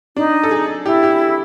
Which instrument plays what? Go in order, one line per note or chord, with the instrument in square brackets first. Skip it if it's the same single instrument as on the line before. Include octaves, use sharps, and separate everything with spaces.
[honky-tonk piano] D4 [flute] D#4
[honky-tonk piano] A4
G#4
[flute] E4 [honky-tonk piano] G4
[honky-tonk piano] G4